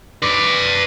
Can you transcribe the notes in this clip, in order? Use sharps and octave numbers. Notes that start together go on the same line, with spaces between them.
B4 D5